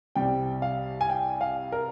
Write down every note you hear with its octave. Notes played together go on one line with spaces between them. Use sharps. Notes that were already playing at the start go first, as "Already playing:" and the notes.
C2 C3 G3 G5
F5
G#5
G5
F5
A#4